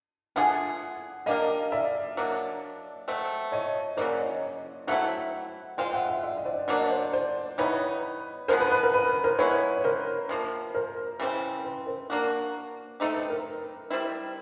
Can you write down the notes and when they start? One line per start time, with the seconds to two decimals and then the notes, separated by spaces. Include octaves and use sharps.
0.36 A3 D4 F4 G#4 F#5 G#5
1.26 A#3 D4 G4 A#4 D#5 F5
1.72 D5 E5
2.17 F#3 A#3 D4
3.08 F#3 A3 C4
3.52 C#5 D#5
3.97 C#3 F#3 A#3 C5 D5
4.20 C#5 D#5
4.87 F#3 A3 C4 E4 E5 F#5
5.77 G#3 C4 F4 F5 G5
5.94 E5 F#5
6.08 E5 F#5
6.23 D5 E5
6.37 D#5
6.45 C5 D5
6.68 B2 F#3 A#3 D4 C#5 D#5
6.90 C5 D5
7.13 C5 D5
7.58 E3 G3 B3 D#4 B4 C#5
8.48 D3 F3 G#3 B3 A#4 C5
8.60 B4
8.72 B4
8.83 A#4
8.94 B4
9.09 B4
9.24 A#4 C5
9.39 G#3 B3 E4 B4 C#5
9.77 C#5
9.84 A#4 C5
10.29 C3 F3 A#3
10.74 A#4 C5
11.20 C#3 E3 G3 C4
11.65 B4
11.87 A#4 C5
12.10 A#3 D4 F#4
13.00 A3 C4 D#4 G4
13.15 B4
13.30 A#4
13.90 G3 C4 E4